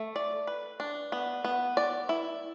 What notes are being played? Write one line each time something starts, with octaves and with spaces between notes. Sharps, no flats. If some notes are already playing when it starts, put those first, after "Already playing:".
Already playing: A3
D5
B4
D4
B3
B3
D5
E4